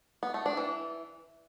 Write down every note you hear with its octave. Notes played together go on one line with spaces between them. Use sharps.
B3
A3
D4
E3